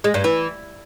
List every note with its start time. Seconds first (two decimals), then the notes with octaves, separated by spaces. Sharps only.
0.04 G#3
0.14 G2
0.24 E3